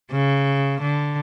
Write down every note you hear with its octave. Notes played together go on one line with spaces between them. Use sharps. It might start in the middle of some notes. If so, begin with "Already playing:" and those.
C#3
D3